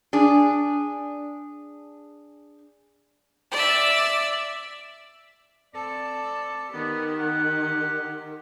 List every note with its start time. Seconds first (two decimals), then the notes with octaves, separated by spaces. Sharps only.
0.13 D4 G#4
3.52 D5 E5
5.75 C4 A4 D5
6.73 D#3 B3 G4
7.19 F#5